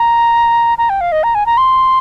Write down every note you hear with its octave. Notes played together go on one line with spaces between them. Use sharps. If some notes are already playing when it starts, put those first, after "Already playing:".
Already playing: A#5
A#5
G5
F5
D#5
A#5
G#5
A#5
C6